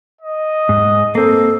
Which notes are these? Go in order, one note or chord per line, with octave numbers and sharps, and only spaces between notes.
D#5
G#2
A#3 C4 A4